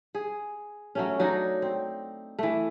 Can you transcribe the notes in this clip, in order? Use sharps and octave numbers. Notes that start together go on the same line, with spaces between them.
G#4
F#3 A3 C#4
F#3 D4 D#4
C4
E3 A3